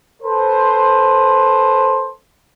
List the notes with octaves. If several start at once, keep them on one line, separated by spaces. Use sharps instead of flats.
A4 B4 C5